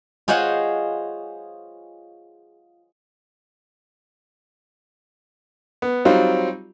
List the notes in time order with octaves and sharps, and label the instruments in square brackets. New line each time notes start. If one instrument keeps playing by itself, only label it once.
[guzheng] F4 G#4 C5 C#5 D#5 F#5
[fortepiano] B3
F#3 G3 C4 D#4 F4